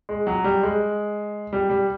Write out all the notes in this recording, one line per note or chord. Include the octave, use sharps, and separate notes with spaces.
G#3
F#3
G3
G#3
G3
G3